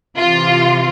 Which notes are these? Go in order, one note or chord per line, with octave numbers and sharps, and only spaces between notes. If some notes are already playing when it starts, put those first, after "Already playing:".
C3 E3 F4